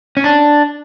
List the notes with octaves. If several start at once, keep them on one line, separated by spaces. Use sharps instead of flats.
C#4
D4